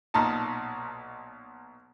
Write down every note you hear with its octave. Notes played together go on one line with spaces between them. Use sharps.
B1 A#2 D#4 A5